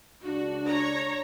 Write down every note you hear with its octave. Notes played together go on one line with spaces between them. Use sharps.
C#2 D4 F#4
C#5 A#5